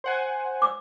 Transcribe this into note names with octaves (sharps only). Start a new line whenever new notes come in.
C5 F#5 G#5
D6 E6